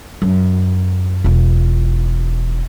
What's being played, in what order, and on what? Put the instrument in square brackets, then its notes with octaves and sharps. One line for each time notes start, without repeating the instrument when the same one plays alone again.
[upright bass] F#2
E1 F4